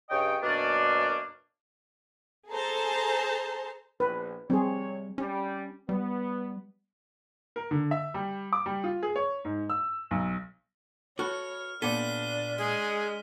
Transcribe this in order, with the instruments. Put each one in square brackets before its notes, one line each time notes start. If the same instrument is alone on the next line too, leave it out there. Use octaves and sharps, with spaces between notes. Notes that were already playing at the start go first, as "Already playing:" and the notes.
[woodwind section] G2 C#3 C#5 D#5 G5
F#2 B2 A#3 C#4 D4
[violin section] G#4 A4 C5 A5 A#5
[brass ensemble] A#1 [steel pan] B4
[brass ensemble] C3 C#5 [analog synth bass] G3 [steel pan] C4 G#4
[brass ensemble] G3 [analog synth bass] C#4
[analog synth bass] G3 [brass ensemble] B3
[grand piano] A#4
D3
E5
G3
D6
G3
F4
G#4
C#5
G#2
E6
B1
[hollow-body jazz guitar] F#4 A4 B4 [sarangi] C#5 [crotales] F6
[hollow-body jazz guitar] A#2 B3 A4 [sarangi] D4 [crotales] B6 D#7 G7
[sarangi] G#3 [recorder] G#4